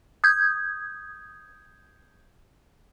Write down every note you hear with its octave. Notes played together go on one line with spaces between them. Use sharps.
D#6 G6 G#6